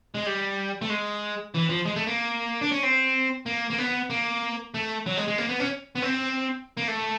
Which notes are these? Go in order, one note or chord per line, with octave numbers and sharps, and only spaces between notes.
G#3
G3
A3
G#3
E3
F3
G#3
A3
A#3
D4
C#4
C4
A#3
A#3
B3
A#3
A3
F#3
G#3
G#3
A#3
B3
C#4
B3
C4
A#3
A3